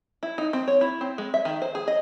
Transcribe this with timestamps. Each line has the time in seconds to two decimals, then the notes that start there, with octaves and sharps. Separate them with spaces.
0.23 E4
0.38 D#4
0.53 C4
0.68 C#5
0.81 E4
1.01 C4
1.18 G#3
1.34 E5
1.45 D#3
1.62 C5
1.75 G#4
1.88 D#5